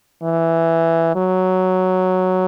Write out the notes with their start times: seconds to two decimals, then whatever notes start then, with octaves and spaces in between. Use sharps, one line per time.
0.23 E3
1.16 F#3